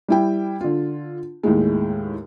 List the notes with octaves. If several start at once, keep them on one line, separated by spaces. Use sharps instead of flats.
G3 E4 G5
D3 F4
D#2 A2 G#3